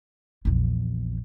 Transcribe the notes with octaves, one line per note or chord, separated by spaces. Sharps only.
A#1 E2